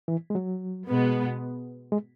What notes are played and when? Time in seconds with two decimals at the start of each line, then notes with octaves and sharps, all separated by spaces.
0.08 E3
0.30 G#3
0.35 F#3
0.88 B2 G#3 B3
1.92 G#3